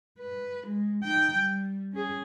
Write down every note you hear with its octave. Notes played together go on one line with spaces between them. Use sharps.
B4
G#3
D#4 G5
G3
C#4 G#4